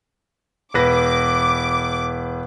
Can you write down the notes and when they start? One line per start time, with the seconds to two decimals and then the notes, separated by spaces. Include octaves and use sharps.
0.74 E1 B4 D6 A#6